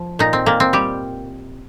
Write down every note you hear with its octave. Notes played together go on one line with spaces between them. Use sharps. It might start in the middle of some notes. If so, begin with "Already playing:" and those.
Already playing: F3
A#2 D#4
C4
A#2 A#3
C4
G3 G4